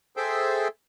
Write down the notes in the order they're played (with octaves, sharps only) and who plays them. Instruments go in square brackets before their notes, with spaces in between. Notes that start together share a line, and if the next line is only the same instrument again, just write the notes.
[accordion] G#4 A4 C5 E5 G5